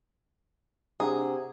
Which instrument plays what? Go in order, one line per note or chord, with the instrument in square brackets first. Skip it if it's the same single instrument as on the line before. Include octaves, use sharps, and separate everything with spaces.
[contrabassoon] C3 [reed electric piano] D4 F#5 A#5 [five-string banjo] G#4